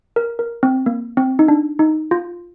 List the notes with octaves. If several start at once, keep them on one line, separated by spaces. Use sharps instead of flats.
A#4
A#4
C4
A#3
C4
D#4
D4
D#4
F4